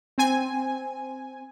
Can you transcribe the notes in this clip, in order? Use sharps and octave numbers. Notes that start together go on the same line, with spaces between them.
C4 G#5